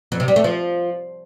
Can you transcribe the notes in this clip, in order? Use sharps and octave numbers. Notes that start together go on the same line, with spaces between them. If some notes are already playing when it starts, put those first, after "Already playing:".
F2
C3
G3
A3
F3